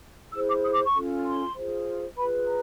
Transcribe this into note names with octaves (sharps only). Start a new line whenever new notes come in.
E4 G#4 C5 E6
D6
D#6
D6
C#6
C#4 F4 A4
C6
F4 G#4 C5
F4 G#4 B4 B5
A#5